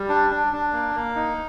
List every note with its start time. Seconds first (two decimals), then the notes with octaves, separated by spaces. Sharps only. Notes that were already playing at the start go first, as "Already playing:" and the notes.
Already playing: G3
0.09 D4
0.30 D4
0.53 D4
0.73 A#3
0.95 A#3
1.16 D#4